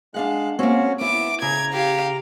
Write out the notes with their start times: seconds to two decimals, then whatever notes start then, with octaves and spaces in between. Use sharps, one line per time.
0.14 G#3 D4 F5 F#5 F#6
0.59 A#3 C4 C#4 F#4 C#5
1.01 B3 E4 D6
1.42 C#3 A#5 G#6
1.73 G4 F5